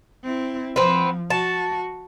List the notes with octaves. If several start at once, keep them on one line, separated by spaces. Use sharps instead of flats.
C4 E4
F3 B3 C4
F#4 A5